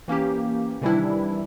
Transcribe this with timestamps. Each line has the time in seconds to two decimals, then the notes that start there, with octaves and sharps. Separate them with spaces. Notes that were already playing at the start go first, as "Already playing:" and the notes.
0.08 E3 A#3 C#4 G4
0.82 C3 D#3 E3 G3 D4 E4